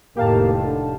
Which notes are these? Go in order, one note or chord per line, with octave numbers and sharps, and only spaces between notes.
F1 A2 D#3 A#3 G4 F5 A5
D3